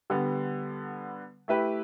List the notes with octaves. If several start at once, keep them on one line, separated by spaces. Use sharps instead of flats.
D3 G3 B3
A3 E4 G4 B4